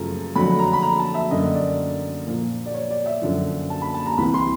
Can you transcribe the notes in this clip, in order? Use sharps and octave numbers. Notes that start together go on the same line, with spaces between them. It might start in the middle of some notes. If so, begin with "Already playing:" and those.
Already playing: F#2 C#3 F3 A3 A#5
F2 D3 F#3 A3 B5
A#5
B5
A#5
A5
E5
F#2 D3 G3 A#3 D#5
D5
A#2 F3 A#3
D5
C#5
D5
E5
F#2 D3 F3
A5
B5
A5
A#5
C2 C3 E3 B5
C6